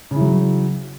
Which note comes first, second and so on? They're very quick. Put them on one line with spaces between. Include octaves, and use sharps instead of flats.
C#3 E3 F#3